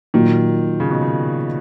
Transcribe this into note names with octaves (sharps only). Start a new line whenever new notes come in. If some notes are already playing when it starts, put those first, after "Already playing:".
A#2 D#3 F#3 A#3
C#3
B2
C#3